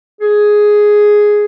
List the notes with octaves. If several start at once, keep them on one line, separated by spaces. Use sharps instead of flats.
G#4